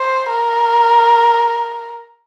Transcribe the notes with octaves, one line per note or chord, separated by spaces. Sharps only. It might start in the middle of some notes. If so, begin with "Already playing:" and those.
Already playing: C5
A#4